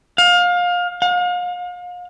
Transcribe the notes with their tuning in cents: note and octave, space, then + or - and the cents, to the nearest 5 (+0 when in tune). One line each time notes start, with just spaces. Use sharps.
F5 +25
F5 +40